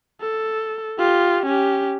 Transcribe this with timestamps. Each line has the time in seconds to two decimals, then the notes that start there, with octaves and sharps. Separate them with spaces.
0.21 A4
0.99 F4 G4
1.46 C#4 G4